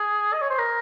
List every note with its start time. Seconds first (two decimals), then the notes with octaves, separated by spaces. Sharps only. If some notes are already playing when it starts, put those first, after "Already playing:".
Already playing: G#4
0.33 D#5
0.41 C#5
0.50 C5
0.58 A#4